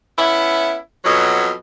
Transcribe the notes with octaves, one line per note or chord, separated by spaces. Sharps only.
B3 C#4 E4
F2 B2 F#3